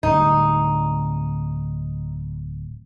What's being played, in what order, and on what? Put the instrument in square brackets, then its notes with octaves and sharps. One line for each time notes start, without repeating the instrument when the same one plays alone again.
[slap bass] D1 G3 [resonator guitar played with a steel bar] D#4